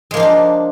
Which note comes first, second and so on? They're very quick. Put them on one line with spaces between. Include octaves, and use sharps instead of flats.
G#3 A#3 F3 F4 D4